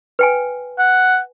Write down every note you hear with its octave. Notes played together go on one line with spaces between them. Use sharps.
B4 G5 G#5
F#5